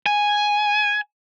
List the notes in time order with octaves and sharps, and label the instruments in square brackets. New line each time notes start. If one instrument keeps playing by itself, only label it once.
[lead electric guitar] G#5